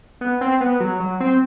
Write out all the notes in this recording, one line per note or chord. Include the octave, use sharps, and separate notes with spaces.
B3
C4
B3
F#3
F#3
C4